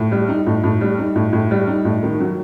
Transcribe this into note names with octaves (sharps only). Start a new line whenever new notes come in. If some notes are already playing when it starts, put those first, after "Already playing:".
Already playing: A2
G3
D#4
A2
A2
G3
D#4
A2
A2
G3
D#4
A2
D#3
F#3